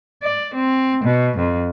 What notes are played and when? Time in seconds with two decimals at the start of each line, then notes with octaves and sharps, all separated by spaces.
0.20 D5
0.55 C4
1.03 B2
1.37 F2